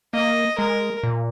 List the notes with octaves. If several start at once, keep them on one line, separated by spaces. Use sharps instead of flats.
A#3 D#5
G#3 A#4
A#2